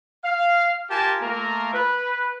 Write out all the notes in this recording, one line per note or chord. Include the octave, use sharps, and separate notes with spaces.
F5
F4 G4 A#4 G#5 A5
A3 A#3 F4 A#4 A#5
B4